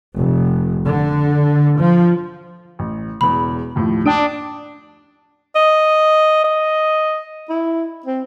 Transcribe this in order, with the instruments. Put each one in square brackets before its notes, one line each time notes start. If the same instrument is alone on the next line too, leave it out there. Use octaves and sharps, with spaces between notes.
[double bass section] F1
D3
F3
[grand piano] A1
[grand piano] E1 E2 [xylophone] B5
[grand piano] D#2 A2 F3
[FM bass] D4 [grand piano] G5 D#6 D7
[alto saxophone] D#5
D#5
E4
C4